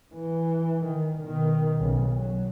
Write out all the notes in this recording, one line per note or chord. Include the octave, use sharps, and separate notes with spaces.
E3
D#3
B2 D#3
B1 C#3
F#3